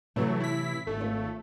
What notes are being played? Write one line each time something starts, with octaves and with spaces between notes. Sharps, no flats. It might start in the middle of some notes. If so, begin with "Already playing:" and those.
A2 C3 E3 F#3 A3
E4 B6
G#1 A3
F4 C#5